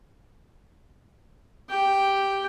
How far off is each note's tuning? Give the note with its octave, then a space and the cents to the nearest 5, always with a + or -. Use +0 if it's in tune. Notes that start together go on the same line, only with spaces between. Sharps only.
G4 +0 G5 +0